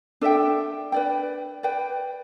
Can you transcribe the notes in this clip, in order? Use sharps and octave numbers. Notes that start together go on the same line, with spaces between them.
D4 A4 E5 G5
B4 D5 G5
B4 D5 G5